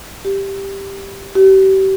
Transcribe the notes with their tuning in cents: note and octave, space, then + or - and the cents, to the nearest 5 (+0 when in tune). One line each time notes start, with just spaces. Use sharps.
G4 +5
G4 -35